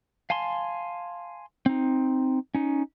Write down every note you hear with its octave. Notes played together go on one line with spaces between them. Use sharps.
F5 G#5 A5 C6
C4 D#4
C#4 D#4